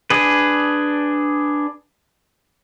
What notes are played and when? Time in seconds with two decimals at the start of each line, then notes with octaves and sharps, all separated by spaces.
0.10 D4 G#4 B4